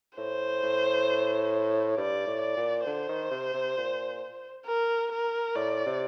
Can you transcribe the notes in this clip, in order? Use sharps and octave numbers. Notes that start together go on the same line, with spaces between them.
A2 C5
A2
G2 D5
A2
D5
A#2
D3 C5
D#3
C3
C3
A#2
A#4
A#4
A2 D5
C3